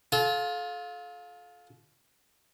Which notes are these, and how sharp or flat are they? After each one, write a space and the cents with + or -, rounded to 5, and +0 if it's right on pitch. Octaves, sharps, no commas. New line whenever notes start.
F4 +20 A4 -35